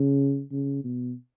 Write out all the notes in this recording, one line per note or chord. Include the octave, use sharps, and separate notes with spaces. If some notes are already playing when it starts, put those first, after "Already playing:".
Already playing: C#3
C#3
B2